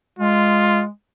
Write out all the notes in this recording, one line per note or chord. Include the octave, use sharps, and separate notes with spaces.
G#3 F4